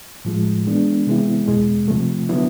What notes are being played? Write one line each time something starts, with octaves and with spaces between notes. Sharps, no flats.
A2 F3 G#3
E3 G#3 B3 D4
C3 E3 G#3 B3 E4
E2 B2 G#3
C3 F3 A3
D3 F#3 B3 E4